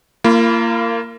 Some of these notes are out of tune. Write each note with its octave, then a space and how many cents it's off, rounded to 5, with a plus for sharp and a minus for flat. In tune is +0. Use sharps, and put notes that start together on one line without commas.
A#3 -20 F4 -40 B5 +0